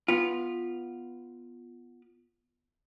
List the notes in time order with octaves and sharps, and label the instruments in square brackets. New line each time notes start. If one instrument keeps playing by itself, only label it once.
[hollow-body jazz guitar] B3 F4